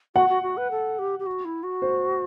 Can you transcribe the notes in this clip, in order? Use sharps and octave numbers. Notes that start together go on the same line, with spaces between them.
F#4 F#5
F#4
F#4
B4
A4
G4
G4
F#4
E4
F#4
C5